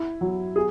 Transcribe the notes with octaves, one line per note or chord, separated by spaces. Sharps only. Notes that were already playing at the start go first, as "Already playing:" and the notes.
Already playing: E4
F#3
G#4